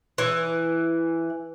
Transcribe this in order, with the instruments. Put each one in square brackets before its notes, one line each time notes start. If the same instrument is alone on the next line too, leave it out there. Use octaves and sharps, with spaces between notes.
[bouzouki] E3